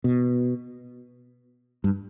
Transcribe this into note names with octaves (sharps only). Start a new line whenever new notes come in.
B2
G2